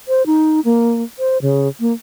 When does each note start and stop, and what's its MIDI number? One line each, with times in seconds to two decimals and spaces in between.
0.08 0.25 72
0.26 0.60 63
0.65 1.03 58
1.19 1.38 72
1.42 1.68 49
1.80 1.93 58